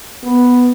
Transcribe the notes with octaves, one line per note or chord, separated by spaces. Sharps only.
B3